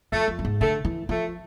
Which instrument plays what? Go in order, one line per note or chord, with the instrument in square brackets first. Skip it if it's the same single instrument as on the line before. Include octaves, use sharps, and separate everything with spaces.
[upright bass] F2 [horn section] A3
[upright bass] F2
G2
G#2
[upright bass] D3 [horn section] A3
[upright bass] E3
[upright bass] F3 [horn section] A3